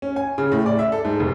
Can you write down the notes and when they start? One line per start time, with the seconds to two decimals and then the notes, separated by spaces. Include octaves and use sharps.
0.02 C#4
0.16 G#5
0.38 C#3
0.52 A2
0.66 D5
0.79 E5
0.92 A4
1.05 G#2
1.20 F1